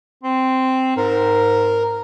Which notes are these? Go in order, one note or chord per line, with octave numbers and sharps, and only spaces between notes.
C4
G#2 A#4